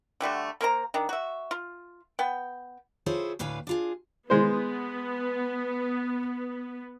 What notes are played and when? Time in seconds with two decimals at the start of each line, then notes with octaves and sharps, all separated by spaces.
0.20 D3 G3 A3 F#4
0.61 A#3 A#4 C5 A#5
0.94 D#3 D4
1.09 F#4 E5
1.51 F4
2.19 B3 G5
3.06 E4 F4 G#4 A4 C5 C#5
3.39 D2 A2 D4 B4 F5 G#5
3.67 D4 F4 G#4
4.30 G#3 B3 C5